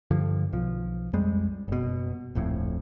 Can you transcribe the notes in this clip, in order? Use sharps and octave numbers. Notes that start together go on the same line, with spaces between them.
G2 D3 F3
B1 F3
F2 G3 G#3
F#1 B2
D1 A#1 F2 A2